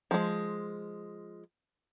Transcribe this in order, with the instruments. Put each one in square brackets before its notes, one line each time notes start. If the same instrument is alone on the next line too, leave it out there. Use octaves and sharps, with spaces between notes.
[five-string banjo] F3 G#3